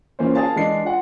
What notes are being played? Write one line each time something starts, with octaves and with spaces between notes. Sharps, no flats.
E3 A#3 C#4 F4 C5
G#4 A#4 F5 A5
E3 G#3 D4 C7
F4 F#5